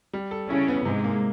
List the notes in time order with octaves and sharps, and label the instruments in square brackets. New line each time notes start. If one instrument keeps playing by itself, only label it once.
[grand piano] G3
A4
[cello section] C#3 C#4 [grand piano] E4
[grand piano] B3
[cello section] G#2 G#3 [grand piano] C3
[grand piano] A#3